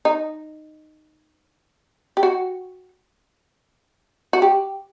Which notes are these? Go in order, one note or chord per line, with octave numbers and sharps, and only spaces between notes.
D#4
G4
F#4
F#4
G4